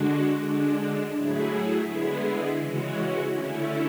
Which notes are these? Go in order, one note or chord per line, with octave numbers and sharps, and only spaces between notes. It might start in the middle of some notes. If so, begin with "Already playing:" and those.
Already playing: D3 G#3 D4 F#4
D3 G#3 D4
A2 F#3 A3 E4 G#4
D3 G#3 B3 E4 G#4
C#3 E3 G#3 C#4 F#4
D3 A3 C#4 E4